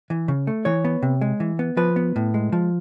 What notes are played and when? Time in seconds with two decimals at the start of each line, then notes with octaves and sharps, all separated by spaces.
0.10 E3
0.28 C#3
0.47 A3
0.65 E3 C#5
0.85 B3
1.03 C3
1.21 G#3
1.40 E3
1.59 B3
1.77 F3 B4
1.96 B3
2.16 A2
2.34 G#3
2.52 F3